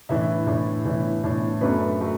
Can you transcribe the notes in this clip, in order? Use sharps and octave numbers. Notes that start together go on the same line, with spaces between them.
A2 E3 D4 E5
A2 E3 D4
A2 E3 D4
A2 E3 D4
F#2 F#3 A3 D4 B4
F#3 A3